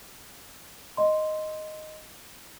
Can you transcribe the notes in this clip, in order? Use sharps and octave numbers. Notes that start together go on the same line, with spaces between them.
D#5 C6